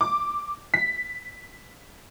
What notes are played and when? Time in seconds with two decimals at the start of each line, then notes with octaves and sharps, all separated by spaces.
0.01 D6
0.74 B6